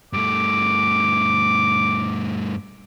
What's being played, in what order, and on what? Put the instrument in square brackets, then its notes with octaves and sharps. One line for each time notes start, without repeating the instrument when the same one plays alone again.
[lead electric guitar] G2 A3 [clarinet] D6